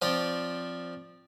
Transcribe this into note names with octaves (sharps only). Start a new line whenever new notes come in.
F3 C4 C#5 D5